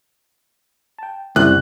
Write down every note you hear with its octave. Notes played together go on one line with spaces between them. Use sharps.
G5 A5
C2 F#2 C#3 F#6